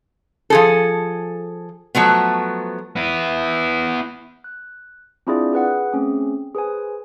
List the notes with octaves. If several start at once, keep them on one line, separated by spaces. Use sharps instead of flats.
F3 G#4 A4
F3 F#3 A3 B3
B3 E4
F#6
C4 D4 E4 F4 G#4 D5
G#4 B4 F#5
A3 C4 C#4 G#4
G#4 B4 C5 G#5